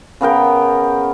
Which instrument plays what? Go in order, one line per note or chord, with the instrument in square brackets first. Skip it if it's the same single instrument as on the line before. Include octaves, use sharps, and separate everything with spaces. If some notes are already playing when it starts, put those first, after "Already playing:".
[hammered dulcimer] C#3 B3 A#4 G5